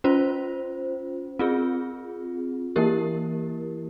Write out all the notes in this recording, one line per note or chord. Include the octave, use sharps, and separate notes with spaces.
C#4 F4 C5
C4 F4 G#4
E3 A#3 E4 G4 A#4